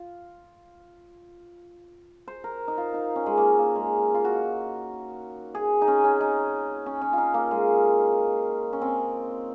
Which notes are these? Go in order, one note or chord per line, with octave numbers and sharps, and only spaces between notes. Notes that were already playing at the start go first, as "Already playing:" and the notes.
Already playing: F4
C5
A#4
D#4
F4
D#4
C#4
G#3
A#3
A#3
G#3
F4
F#4
G#4
D#4
C#4
C#4
D#4
C#4
C#4
D#4 F4
A#3
G#3
C#4
C4